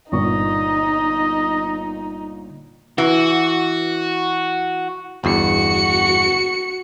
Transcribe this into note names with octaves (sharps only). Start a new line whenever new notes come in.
G1 A#2 D#4 D#5 C#6
E3 F#4
G1 E2 F#4 C#7